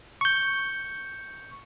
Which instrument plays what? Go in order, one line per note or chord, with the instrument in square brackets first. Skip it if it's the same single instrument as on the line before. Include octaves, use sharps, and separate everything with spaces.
[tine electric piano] C#6 G6